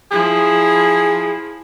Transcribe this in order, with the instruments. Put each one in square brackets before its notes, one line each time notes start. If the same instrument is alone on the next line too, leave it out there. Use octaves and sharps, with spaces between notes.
[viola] F3 E4 [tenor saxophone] G#4